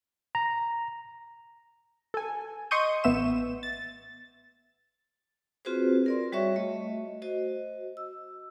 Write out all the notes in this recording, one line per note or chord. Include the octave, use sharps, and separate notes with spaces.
A#5
A4 G#5
D#5 C6 C#6 D#6 G6 D#7
A1 B3 E5 E7
A6
C4 F4 F#4 G#4 B4 C5
A#4 D5 C6
G3 F#4 C#5 E5 C#6
A3 D#5
F#4 C5 D#5
E6